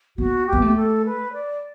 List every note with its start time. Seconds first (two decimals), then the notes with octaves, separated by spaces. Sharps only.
0.18 B3 F#4
0.47 G4
0.53 B3
0.62 A3
0.76 A4
1.05 B4
1.33 D5